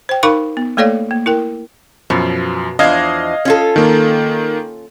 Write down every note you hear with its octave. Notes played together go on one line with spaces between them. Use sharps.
C5 G5
D#4 A#4 F5 B5 C#6 D6
B3
A3 A#3 A4 C#5 D5 F5
A#3
E4 A#4 G5
F#2 B2 F3
E2 F3 D4 D#5 F5 G#6
C#4 F4 A4
D#3 A#3